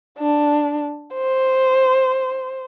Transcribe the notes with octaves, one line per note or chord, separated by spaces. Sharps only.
D4
C5